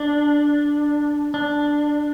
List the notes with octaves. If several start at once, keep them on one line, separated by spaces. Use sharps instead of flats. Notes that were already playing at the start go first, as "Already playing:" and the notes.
Already playing: D4
D4